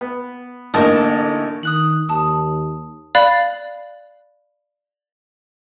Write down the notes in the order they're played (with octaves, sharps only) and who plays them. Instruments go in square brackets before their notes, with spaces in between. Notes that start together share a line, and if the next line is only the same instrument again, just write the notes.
[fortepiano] B3
[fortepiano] A1 D#4 A5 [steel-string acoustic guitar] D3 A#3 C#4
[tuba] D#3 [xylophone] D#6 F#6 F#7
[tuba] D#2 [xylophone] A5 D#6
[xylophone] D5 F5 B5 F#6 A6